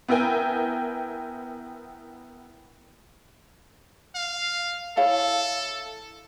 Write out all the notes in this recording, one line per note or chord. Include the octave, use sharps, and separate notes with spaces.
B3 E4 A#4 G5 G#5
F5
E4 A4 C#5 F5